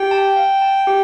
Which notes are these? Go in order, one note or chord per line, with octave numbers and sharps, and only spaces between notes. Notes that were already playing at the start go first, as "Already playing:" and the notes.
Already playing: G4 G5
A5
F5
A5
G4